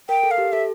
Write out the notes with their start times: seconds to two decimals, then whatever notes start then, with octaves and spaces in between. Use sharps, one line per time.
0.09 A#4 G5
0.23 A4
0.31 F5
0.38 G4
0.52 A4 E5